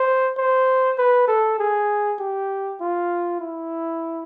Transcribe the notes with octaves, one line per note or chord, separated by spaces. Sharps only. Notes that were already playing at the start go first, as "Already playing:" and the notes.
Already playing: C5
C5
B4
A4
G#4
G4
F4
E4